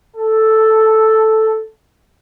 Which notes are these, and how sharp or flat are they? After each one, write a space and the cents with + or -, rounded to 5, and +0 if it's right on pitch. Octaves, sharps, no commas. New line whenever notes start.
A4 +0